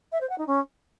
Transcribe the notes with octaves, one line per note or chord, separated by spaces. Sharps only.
E5
C5
F#5
D#4
C#4